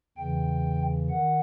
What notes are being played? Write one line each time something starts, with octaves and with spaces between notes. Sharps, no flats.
E2 C#3 E3 G5
D#3 F#5